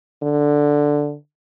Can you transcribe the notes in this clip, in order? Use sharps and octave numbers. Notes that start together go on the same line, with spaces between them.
D3